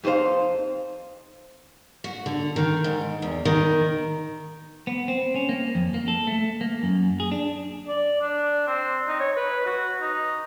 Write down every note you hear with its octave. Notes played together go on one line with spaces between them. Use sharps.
F2 D#4 A4 C5 F5
F#4
D3
D#3
G#2
E2
D#3
B3
C4
C#4
A#3
F2
A#3
A4
A3
A#3
F#2
G#4
D4
D5
D4
C4
D#4
C#5
B4
F#4
D#4